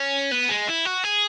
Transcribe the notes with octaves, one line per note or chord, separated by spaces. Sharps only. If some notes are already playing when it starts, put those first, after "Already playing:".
Already playing: C#4
B3
G#3
E4
F#4
G#4